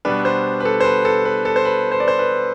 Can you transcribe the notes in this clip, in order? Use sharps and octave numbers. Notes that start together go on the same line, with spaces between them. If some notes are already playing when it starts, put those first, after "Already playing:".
B2 G3 B3 D4 B4
C5
B4
A4
C5
B4
A4
B4
A4
C5
B4
C5
D5
C5
B4